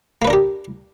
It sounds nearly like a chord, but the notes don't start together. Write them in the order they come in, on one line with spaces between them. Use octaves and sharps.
A#3 B4 D4 A#4 G4